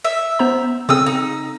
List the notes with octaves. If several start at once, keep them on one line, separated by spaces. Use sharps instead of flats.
E5
B3 C5 A#5
C#3 C4 A4 D#6 E6
D#4